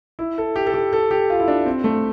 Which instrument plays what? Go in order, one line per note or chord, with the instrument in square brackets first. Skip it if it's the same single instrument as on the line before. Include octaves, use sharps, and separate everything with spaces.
[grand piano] E4
A4
G4
A4
G4
A4
G4
F4
E4
D4
C4
A3